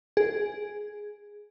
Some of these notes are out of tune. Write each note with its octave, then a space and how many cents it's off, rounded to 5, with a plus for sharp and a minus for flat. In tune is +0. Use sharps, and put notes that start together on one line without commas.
G#4 +0